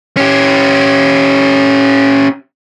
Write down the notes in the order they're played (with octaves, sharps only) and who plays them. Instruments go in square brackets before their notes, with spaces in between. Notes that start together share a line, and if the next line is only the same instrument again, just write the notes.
[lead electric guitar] C#4 G4